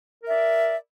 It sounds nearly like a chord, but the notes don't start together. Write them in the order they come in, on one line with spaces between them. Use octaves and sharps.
A#4 E5 D5